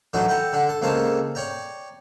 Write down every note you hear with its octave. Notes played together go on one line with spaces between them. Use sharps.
A2 E3 F#3 D4 D#4 F#4
A4 F#5 G5 A#5
D3 D4 F#5
A4
C#2 A#3 C4 A4 C#5 A5
C#5 D5 G5 A#5